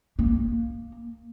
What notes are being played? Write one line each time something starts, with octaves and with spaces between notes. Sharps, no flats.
A#3